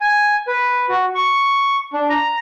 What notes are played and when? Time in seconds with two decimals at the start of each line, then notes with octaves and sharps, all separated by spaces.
0.01 G#5
0.47 B4
0.89 F#4
1.15 C#6
1.93 D4
2.09 A#5